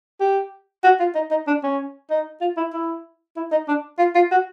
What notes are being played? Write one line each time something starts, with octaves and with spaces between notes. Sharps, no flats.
G4
F#4
F4
D#4
D#4
D4
C#4
D#4
F4
E4
E4
E4
D#4
D4
F4
F4
F#4